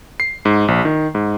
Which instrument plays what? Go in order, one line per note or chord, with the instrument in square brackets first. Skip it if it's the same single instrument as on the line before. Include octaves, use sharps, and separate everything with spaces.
[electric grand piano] C7
G#2
A#1
D#3
G#2